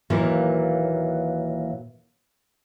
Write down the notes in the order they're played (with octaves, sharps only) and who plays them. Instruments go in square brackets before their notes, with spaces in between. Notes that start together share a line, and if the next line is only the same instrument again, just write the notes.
[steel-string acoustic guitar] D#2 A#2 E3 F#3 A#3